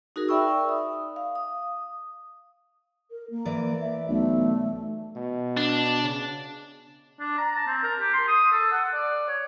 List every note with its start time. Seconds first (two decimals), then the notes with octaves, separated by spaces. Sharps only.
0.16 D#4 F#4 G#4 A#4
0.29 D5 E5 G5 B5 C#6 E6
0.69 D#6
1.16 F5
1.35 D#6
3.11 A#4
3.30 A#3
3.45 E3 D5
3.79 E5
4.09 B1 A3
5.16 B2
5.57 D4
6.03 C#3
7.20 D4
7.38 A#5
7.56 A5
7.68 C4
7.83 A#4
8.00 G4
8.14 C6
8.28 D#6
8.52 A4
8.72 F#5
8.93 D5
9.28 C#5